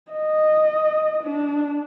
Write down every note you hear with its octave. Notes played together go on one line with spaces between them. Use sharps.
D#5
D4